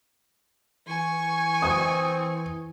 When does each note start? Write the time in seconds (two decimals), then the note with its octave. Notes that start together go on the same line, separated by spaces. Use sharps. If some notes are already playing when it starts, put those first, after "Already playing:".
0.88 E3 G#5 C#6
1.62 C4 D#6